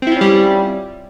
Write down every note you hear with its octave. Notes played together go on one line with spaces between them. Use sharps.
G3 C4 C#4 E4 F4